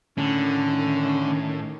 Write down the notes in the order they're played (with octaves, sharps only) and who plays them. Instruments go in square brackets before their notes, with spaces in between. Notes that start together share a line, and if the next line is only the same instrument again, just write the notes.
[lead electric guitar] A2 [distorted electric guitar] D3 [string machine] D#3 [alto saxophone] C#4